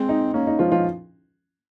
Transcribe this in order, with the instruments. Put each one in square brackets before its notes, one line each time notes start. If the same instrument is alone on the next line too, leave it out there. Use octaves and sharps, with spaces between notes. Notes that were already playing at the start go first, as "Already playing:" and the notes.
Already playing: [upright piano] G#3 G#4 [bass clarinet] C4
[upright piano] D#4
[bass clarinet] A#3 [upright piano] C#4
[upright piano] D#4
[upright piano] F3 F4 [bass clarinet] G#3
[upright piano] F3 F4